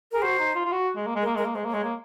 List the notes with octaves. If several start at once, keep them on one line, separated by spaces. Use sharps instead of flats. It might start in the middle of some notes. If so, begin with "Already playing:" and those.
G#4 A#4
F#4 C5
D#4
F4
F4
F#4
G#3
A#3
G#3
A#4
A#3
G#3 A#4
A#3
G#3 C5
A#3
G#3 C#5
A#3